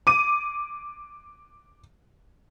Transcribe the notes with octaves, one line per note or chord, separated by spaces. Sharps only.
D6 D#7